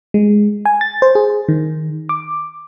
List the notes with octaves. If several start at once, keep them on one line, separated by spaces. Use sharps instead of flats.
G#3
G#5
A6
C5
G#4
D#3
D6